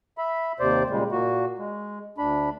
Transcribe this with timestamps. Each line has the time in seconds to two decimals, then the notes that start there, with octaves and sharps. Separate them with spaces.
0.18 E5 B5
0.60 D#2 C3 C5 D5
0.90 A#2 C#3 G3 G#3
1.12 A#2 A#3 F#4
1.58 G#3
2.18 D2 D4 B5